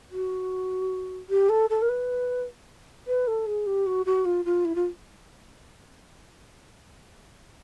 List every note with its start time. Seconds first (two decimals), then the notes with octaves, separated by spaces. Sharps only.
0.11 F#4
1.29 G4
1.49 A4
1.69 A4
1.81 A#4
1.89 B4
3.07 B4
3.27 A4
3.46 G#4
3.66 G4
3.86 F#4
4.05 F#4
4.25 F4
4.45 F4
4.64 E4
4.75 F4